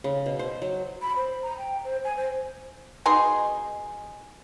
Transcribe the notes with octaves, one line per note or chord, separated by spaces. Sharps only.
C#3
B2
C5
F#3
B5
C5
A#5
G5
C5
G#5
C5
B2 D#4 G#4 C6